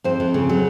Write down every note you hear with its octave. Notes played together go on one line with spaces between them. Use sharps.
F2 C5
F2
C#3
F#3